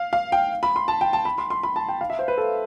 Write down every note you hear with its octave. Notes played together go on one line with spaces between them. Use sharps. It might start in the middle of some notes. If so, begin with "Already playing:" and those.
Already playing: F5
F5
G5
B5
C6
A5
G5
A5
B5
C6
C6
B5
A5
G5
F5
E5
C5
B4
A4